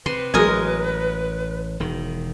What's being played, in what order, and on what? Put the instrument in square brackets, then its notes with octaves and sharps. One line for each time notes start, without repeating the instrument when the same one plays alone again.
[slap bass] C3 [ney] B4 [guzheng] C6
[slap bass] A1 [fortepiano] F#3 G#3 [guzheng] A#4 D#5 G#5
[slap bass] E1 D#3